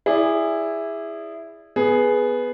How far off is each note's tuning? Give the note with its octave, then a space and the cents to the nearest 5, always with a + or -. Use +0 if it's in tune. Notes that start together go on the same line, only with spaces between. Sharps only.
E4 +0 G#4 -20 D5 +0
B3 +0 G#4 +10